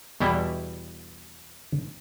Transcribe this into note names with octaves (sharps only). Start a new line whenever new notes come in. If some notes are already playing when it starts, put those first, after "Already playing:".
E2 B2 G3 E4